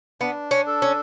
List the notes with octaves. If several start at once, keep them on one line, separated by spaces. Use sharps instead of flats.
B3 D4
C#4
A4
C#4